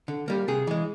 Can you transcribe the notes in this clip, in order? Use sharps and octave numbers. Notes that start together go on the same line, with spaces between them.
D3
G3 A#3
C3 G#4
E3 G#3